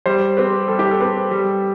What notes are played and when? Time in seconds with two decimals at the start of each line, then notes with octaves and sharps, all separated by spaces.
0.06 G3 C5
0.37 C4 G4 B4
0.68 G3 A4
0.79 G4
0.91 A4
1.00 C4 G4 B4
1.31 G3